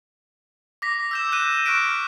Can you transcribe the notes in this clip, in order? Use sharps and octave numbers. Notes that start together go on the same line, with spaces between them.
D6 A#6 B6
E6 G6 E7
F#6 D#7
C#6 F6 F#6 B6 D7